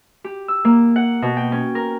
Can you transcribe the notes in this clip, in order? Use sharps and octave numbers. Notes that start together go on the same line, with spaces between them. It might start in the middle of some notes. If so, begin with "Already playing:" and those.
G4
E6
A#3
F#5
B2
G5
C#4
A#4